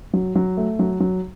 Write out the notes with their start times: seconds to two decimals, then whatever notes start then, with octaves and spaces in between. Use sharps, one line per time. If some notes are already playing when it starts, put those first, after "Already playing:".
0.13 F#3
0.36 F#3
0.57 A3
0.79 F#3
1.00 F#3